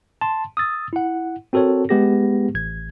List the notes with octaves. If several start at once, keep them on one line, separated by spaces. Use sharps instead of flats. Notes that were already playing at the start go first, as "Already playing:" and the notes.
A5 C6
D#6 E6 A6
E4 F#5
C4 F#4 A4 A#4 C#5
G#3 B3 G4 G#4 A#6
A1 G#6